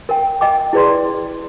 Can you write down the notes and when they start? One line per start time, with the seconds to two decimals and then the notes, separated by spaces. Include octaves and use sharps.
0.09 A#4 G5
0.41 D#5 G5 D6
0.73 E4 G#4 B4 D5 C6